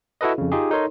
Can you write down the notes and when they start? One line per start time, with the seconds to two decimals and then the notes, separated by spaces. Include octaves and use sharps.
0.21 E4 F#4 A4 B4 D#5
0.38 F2 C#3
0.52 D#4 F4 G4 G#4
0.71 D#4 A4 A#4 C#5 C6